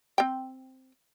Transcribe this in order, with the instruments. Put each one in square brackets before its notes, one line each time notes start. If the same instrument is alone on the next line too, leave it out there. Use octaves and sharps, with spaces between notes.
[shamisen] C4 G5